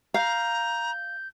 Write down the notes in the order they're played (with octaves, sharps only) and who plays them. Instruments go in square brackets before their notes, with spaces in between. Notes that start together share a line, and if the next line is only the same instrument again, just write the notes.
[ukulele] F5 [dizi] A#5 [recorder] G6